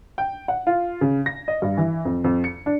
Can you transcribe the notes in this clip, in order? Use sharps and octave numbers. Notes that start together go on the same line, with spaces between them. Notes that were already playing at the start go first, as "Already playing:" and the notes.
G5
F#5
F4
C#3
A#6
D#5
G2
E3
F2
F2
C#7
D4